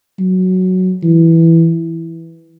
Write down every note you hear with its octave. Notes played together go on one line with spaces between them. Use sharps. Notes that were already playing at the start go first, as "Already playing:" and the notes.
F#3
E3